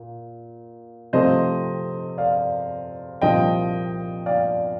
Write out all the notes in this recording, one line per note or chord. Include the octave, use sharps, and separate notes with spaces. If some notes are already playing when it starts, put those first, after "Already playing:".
Already playing: A#2
C3 F3 A3 C4 C5 D#5
D5 F5
C2 A#2 F3 D#5 G5
D5 F5